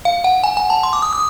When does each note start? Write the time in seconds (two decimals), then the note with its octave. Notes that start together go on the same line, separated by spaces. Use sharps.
0.05 F5
0.24 F#5
0.44 G#5
0.57 G#5
0.70 A5
0.83 C6
0.93 D6
1.02 D#6
1.13 D#6